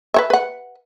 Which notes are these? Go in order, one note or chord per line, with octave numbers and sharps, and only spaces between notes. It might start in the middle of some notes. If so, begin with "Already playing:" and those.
B4 C#5 E5
B4 F#5